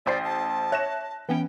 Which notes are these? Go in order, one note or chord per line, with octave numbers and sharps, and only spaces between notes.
A1 C5 D5 C7
A5
C#5 E5 F#6 A#6 E7
E3 B3 C#4 G5